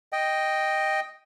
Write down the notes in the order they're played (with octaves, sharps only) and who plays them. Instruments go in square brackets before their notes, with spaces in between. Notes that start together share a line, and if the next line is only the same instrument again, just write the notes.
[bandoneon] D#5 G5